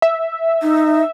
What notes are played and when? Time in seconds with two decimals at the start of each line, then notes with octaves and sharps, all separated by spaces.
0.02 E5
0.62 D#4